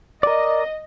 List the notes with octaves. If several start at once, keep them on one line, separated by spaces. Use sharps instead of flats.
A#4 D5 D#5